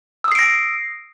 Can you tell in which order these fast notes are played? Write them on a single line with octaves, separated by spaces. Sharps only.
E6 D#6 C7 D7 A#6